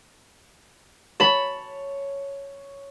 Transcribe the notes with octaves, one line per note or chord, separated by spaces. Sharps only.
C#5 A5 B5